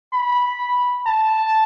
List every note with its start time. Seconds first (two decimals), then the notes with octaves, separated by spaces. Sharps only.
0.13 B5
1.06 A5